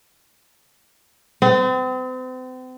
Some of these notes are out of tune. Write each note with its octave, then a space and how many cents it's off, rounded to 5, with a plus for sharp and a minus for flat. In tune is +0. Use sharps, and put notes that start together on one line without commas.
C4 -40